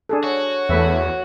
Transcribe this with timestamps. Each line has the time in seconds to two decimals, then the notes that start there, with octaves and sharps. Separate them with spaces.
0.09 D4 G#4 A4
0.24 F#4 C#5
0.69 E2 A3 B4 E5